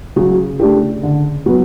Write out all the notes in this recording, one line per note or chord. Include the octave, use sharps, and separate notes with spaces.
C#3 F#3
A3 D4 G4
D3
F#3 B3